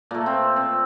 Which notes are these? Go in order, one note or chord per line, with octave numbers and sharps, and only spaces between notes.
A#2 A3 A#3
C4
C4